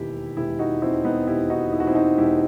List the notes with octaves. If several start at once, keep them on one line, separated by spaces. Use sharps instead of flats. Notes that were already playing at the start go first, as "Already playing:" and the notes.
Already playing: E1 D#2 D#3 E4 G4
E1 E4 G4
D#4 F#4
D#2 D#3 C4 E4
B3 D#4
E1 E4 G4
D#4 F#4
D#2 D#3 E4 F#4
C4 E4
D#4 F#4
E1 E4 G4